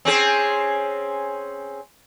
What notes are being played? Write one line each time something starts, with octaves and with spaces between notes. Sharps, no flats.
C4 C#4 G#4